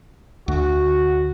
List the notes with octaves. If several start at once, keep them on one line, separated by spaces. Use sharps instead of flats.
D2 F#4